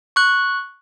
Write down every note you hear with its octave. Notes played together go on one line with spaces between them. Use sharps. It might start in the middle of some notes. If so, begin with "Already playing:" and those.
C#6 F#6